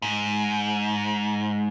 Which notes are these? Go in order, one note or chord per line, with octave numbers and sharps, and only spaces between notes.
G#2